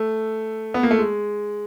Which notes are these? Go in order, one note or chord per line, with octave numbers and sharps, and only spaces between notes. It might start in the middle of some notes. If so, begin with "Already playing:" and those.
Already playing: A3
B3
A#3
A3
G#3